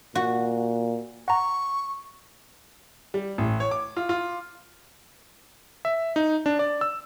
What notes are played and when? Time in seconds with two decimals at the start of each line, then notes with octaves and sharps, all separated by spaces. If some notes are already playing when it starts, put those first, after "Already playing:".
0.15 A#2 F#4
1.28 F#5 A#5 C#6
3.14 G3
3.38 A1
3.60 C#5
3.71 D6
3.97 F4
4.09 F4
5.85 E5
6.16 D#4
6.46 D4
6.59 D5
6.81 E6